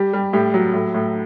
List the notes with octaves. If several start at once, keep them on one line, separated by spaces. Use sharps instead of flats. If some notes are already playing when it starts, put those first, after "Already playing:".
Already playing: G3 G4
G3
A2 G4
F#3
A2
A2